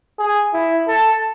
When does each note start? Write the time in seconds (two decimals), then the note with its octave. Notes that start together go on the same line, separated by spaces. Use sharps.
0.19 G#4
0.53 E4
0.88 A4